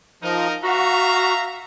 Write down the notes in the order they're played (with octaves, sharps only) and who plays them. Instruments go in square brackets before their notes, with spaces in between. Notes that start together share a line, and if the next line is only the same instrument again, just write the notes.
[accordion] F3 [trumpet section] D#4 A#4
[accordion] F#4 [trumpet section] E5 F5 A#5